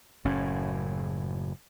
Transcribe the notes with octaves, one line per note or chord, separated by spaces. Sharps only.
F#1 A2 C#4